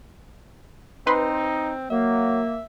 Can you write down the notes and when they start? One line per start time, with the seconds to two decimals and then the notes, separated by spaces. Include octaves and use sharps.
1.07 C4 D#4 B4 C6
1.90 F#3 A#3 E5